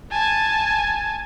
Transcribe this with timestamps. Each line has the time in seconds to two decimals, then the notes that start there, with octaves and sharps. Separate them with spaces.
0.12 G#5 A5